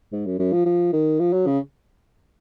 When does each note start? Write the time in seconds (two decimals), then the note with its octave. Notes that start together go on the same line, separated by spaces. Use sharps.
0.12 G#2
0.26 F#2
0.39 F#2
0.53 F3
0.65 F3
0.93 D#3
1.20 F3
1.33 F#3
1.47 C#3